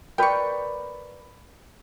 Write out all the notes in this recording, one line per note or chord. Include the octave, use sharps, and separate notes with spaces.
A#4 B4 D5 G5 C#6